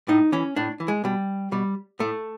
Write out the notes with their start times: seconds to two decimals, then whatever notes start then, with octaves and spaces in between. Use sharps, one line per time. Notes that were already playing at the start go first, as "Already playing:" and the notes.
0.08 A2 D#4
0.32 E3 C#4
0.56 A2 D4
0.80 E3
0.88 G#3
1.04 B2 G3
1.52 B2 G3
1.99 A2 A3